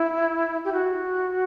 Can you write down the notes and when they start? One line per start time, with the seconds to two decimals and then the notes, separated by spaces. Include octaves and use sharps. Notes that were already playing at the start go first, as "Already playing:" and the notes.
Already playing: E4
0.65 G4
0.72 F#4